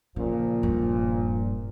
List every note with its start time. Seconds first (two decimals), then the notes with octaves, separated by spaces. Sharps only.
0.16 A#2 C#3 F3
0.63 D#1 G2